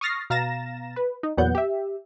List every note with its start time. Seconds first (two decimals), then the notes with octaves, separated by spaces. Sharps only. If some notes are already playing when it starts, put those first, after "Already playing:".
0.01 C#6 D#6 F6 A6 A#6 C7
0.30 B2 F5 A#5 A6 A#6 E7
0.96 B4
1.23 D#4
1.37 E2 A#2 F#3 B3 F#5 G6
1.55 G4 E5